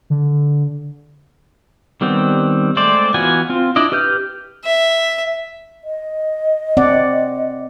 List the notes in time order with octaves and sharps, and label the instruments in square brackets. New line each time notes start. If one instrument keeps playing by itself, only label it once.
[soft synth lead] D3
[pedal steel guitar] D#3 G3 B3 C4
G#3 A3 C4 C5 D5
E3 B3 F4 F#4 G#5
C4 F4
D4 E4 D5 D#5
G4 B4 F6 G6
[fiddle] E5
[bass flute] D#5
[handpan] C4 D5 F#5